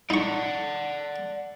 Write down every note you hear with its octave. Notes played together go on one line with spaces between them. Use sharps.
D#4 D5 F#5 C#6